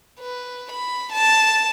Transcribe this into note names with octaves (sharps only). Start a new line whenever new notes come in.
B4
B5
A5